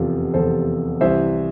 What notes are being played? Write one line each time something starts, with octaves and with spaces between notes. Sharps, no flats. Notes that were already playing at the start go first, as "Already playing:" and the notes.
Already playing: F1 E2 C3 F4 A4
F1 E2 C3 A4 C5
C2 C3 E3 C5 E5